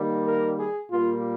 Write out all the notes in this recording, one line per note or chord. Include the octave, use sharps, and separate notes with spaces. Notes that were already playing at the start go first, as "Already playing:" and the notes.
Already playing: D#3 G3 A#3
A#4
G#4
A#2 G3 A#3 F4